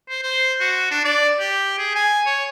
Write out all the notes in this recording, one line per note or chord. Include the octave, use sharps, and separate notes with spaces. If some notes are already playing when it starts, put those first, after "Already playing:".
C5
C5
F#4
D4
D5
G4
G#4
G#5
C#5